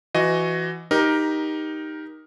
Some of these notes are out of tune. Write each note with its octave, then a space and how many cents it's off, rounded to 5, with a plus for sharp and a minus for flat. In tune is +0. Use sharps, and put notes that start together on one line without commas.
E3 +20 F#4 +0 D#5 +0
D#4 +0 G4 +0 A#4 +15